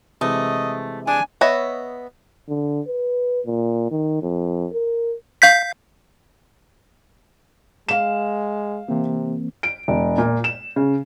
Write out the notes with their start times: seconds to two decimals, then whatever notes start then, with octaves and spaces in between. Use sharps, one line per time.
0.21 C3 E3 G#3 A3 D#5
1.07 D4 G#4 G#5
1.41 B3 C#5 D#5 E5
2.49 D3
2.87 B4
3.46 A#2
3.91 D#3
4.22 F2
4.73 A#4
5.42 F5 G6 B6
7.89 G#3 F5 E7
8.89 C3 E3 A#3 C4
9.63 D7
9.88 E1
10.18 A#2
10.44 E7
10.76 C#3